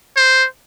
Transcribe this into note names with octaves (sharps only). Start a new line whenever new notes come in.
C5